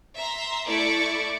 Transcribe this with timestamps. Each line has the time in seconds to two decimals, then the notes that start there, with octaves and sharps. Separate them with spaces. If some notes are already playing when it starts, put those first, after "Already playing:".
0.16 E5 A#5 C6
0.65 A3 E4 D5 C#6 D7